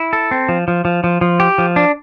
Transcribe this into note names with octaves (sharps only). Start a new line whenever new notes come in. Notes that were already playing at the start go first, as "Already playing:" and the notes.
Already playing: E4
A4
C4
F3
F3
F3
F3
F3
G4
F3
D4